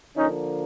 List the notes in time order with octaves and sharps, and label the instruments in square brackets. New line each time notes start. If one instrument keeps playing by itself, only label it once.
[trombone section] D3 F3 A#3 C#4 D#4